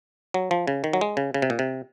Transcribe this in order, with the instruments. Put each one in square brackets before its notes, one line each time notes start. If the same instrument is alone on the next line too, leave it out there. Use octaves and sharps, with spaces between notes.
[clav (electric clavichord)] F#3
F3
C#3
D#3
F#3
G#3
C#3
C#3
C3
A#2
C3